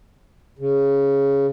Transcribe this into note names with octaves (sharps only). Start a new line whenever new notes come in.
C#3